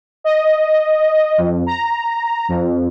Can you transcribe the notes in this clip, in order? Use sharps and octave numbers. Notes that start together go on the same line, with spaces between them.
D#5
F2
A#5
F2